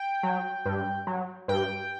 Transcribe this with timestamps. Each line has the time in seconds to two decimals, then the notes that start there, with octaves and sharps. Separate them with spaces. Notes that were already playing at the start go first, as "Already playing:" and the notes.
Already playing: G5
0.23 F#3
0.66 G2
1.07 F#3
1.48 G2 G5